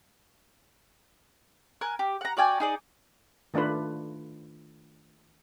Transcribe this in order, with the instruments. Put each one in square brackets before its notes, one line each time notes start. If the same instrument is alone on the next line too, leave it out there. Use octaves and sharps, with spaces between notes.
[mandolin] A#4 G#5 F#6
G4
F#5 A#5
F#4 D5 G5 G#5
D#4 G#4 D5
[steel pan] D#3 A3 D4 F4 B4